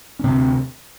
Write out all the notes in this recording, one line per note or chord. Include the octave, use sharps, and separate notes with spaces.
C#4
D2 C3 C4